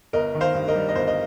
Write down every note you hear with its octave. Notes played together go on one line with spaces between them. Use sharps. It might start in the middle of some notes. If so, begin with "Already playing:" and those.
G1 A#4 D#5
D#3
C5 F5
G2
A#4 D#5
G3
D#5
G1 C5
D#5